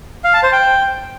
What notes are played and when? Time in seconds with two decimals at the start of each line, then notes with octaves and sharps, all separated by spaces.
0.24 F5
0.34 A5
0.43 C5
0.52 G5